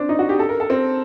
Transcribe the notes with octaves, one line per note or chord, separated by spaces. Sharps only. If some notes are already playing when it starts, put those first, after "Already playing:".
Already playing: C4 D4
D#4
F#4
G4
A4
A#4
A4
C4